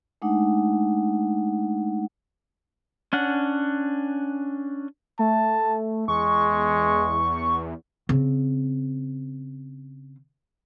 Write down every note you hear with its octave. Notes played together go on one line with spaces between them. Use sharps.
G#3 A3 D4 D#4 F#5
C#4 D4 F#5
A3 A5
E2 G#3 C#6
C#3 C4